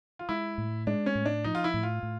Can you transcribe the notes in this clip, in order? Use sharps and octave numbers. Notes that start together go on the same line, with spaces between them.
F4
G#3 E4
A2
G#3 D4
C#4
A2
D4
F3 D#4
F4
E4
A2
F4
A2